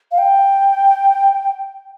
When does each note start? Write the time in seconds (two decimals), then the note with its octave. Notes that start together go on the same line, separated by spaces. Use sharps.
0.12 F5
0.18 G5